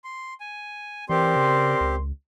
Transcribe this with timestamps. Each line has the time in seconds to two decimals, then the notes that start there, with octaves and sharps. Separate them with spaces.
0.04 C6
0.40 G#5
1.09 E3 C4 G4 A#4 D5 C6
1.36 C#3
1.81 C#2